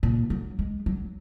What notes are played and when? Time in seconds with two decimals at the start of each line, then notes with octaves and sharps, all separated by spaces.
0.03 A#2
0.30 F#3
0.59 G#3
0.86 F#3